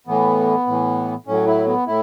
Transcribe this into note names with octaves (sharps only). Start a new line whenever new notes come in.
A2 E3 B3
A2 E3
A2 F#3 C#4
E4
B3
A2 E4